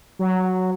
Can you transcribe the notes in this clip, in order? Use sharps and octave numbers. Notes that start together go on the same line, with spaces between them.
F#3